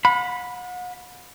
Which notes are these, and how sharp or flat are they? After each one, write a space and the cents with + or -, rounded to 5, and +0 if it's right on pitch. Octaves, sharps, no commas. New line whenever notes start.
F#5 -40 B5 +0